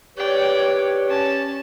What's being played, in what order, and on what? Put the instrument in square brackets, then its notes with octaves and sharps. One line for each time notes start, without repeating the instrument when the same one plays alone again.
[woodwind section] G4 B4 C#5 [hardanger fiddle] D5 G5
[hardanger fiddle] C#4 A5